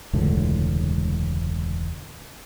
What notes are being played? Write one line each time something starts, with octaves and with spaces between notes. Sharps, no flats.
E1 C#2 A2 D3